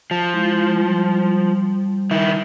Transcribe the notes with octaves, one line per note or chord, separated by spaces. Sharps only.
F3
G#3 E4 F4
G3
D#3 E4